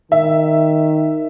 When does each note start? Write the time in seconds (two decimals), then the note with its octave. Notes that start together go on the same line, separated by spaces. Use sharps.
0.12 D#3 E5